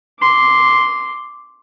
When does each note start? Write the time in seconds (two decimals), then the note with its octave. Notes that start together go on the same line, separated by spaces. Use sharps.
0.20 C6 D6